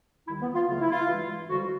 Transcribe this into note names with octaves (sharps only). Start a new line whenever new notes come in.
D#2 D#3 G3 E4
B3
F4
C#2 C#3 F#3 A3 F4
E4
F4
G2 E3 G#3
F2 D3 G3 F#4